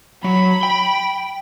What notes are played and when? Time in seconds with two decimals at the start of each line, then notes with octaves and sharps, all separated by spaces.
0.24 F#3 B5
0.63 G5